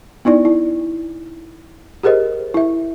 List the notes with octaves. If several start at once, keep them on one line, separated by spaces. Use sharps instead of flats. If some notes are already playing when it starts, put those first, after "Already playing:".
B3 D#4 E4 D5
E4
G4 G#4 A#4 C5 D#5
E4 E5